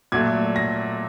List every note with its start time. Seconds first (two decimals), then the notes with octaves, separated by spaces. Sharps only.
0.12 A#2 F#3 A3 G#6
0.56 A#6